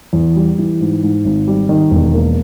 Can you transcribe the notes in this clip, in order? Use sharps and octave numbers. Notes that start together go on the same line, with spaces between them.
E2
G3
E3
G#2
G#2
G#1
G3
D#3
E1
A#3